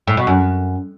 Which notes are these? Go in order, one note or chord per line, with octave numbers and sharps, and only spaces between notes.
A2
B2
F#2